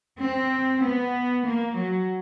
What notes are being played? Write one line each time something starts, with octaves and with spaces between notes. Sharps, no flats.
C4
B3
A#3
F#3